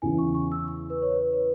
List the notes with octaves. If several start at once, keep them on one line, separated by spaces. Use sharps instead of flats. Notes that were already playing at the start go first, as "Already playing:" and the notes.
E2 C#3 E3 G#5
C#6
C#6
E6
C#6
B4
C#5
B4
B4